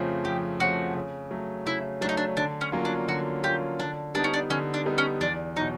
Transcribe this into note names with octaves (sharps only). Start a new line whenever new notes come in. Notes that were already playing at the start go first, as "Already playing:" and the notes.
Already playing: F2 C#3 F3 A3 C4
F2 G4
C#3 F3 A3 C4 F#4
C#3
F#3 A3
C#3 E4
F#3 A3 D4 D#4
D4
D3 D4
C#4
F#3 A#3 C#4 F4
D4
D3 F#4
F#3 A#3 C#4 F4 G4
D3 D4
G3 B3 D4 D#4
C#4
D4
D3 C#4
D4
G3 B3 D#4
C#4
E2 D4
B2 F#3 D#4